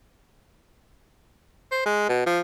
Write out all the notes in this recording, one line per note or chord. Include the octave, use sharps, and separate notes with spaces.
C5
G#3
B2
F3